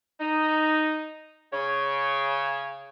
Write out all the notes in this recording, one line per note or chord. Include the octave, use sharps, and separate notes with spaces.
D#4
C#3 C#5